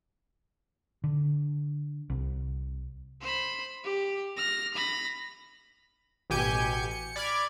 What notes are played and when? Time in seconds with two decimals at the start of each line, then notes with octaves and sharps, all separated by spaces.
1.04 D3
2.10 C2
3.21 C5 B5
3.84 G4
4.37 F6 A#6
4.74 B5 A#6
6.30 A1 B2 G4 G#5 G6 C#7
6.91 C#7
7.16 D5 B5 D6 F6 G#6